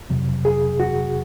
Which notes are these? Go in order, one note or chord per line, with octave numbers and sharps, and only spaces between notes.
F2 C3 F#3
G#4
F#4